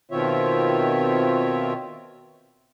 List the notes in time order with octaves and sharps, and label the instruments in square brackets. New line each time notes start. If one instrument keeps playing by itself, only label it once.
[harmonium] B2 D#3 C4 F4 C#5 E5